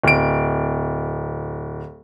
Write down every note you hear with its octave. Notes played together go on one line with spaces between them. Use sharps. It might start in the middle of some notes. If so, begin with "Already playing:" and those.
D1 D7